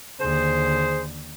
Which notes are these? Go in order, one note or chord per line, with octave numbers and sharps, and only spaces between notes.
D#2 D3 G#4 C5